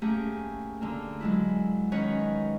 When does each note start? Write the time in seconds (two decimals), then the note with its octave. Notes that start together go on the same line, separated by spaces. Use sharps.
0.02 A3 A#3 C#4 G4 G#4
0.81 D3 A#3 D4
1.21 F#3 G#3 E4
1.92 D#3 C#4 D#4 B4 C#5